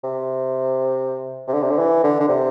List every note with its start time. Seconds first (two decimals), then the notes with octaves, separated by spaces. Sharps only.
0.04 C3
1.48 C3
1.54 D3
1.63 C3
1.71 D3
1.79 E3
2.04 D3
2.20 D3
2.28 C3